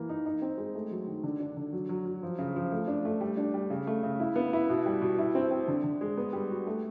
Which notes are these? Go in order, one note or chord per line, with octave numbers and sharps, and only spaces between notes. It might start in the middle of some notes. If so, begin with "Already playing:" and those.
Already playing: E3 A#3
D#4
D#4
C4
G#3
A3
F#3
D#3
D3
D4
D3
F#3
F#3
F#3
F3
C#3
F3
A3
D4
A3
G3
D4
G3
C#3
A3
C#3
E4
B3
E4
B2
G3
B2
E4
C4
C4
D3
D3
G#3
B3
G3
F#4
A3